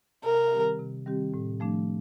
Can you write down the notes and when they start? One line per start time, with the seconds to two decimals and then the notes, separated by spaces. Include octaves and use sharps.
0.24 C3 A#4
0.52 D#3 G3 C4 G4
0.79 C3
1.06 D#3 G3 C4 G4
1.34 A2
1.60 F3 A3 D4